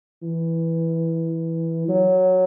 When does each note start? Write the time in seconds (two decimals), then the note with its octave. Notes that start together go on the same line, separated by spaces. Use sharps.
0.22 E3
1.88 F#3